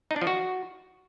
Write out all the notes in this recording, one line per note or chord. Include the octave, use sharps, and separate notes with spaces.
D#4
D4
F3
F#4